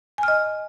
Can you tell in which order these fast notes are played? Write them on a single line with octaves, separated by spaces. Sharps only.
G#5 F6 D#5